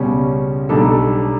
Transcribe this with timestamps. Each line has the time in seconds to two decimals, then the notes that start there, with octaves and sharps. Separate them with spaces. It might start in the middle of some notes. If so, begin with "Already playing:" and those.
Already playing: C#2 B2 G3 C#4
0.69 B1 B2 G3 D4 A4